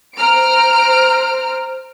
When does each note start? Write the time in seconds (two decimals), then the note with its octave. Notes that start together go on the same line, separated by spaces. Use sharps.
0.15 C5 A#5 F6 D7